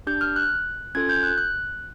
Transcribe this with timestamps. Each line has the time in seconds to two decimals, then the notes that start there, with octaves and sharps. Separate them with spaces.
0.07 D4 G4 G6
0.21 F6
0.36 F#6
0.95 C#4 F4 A4 G#6
1.09 G6
1.23 F#6
1.38 F#6